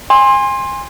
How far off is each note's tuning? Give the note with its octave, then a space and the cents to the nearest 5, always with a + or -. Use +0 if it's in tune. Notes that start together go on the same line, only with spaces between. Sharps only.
G#5 -25 C6 +20